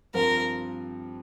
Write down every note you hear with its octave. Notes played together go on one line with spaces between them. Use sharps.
G2 F3 C4 F4 A#4